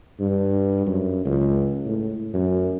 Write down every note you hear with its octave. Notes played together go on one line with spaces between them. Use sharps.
G2
F#2
C#2
A2
F#2